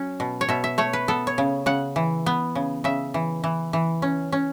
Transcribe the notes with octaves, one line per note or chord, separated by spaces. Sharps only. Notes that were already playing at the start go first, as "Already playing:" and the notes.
Already playing: F#3 C#4
B2
C#5
B2 E5
E5
A3 C#5
B4
B3 A4
C#5
C#3
C#3 F#5
E3
B3
C#3
C#3 E5
E3
E3
E3
C#4
C#4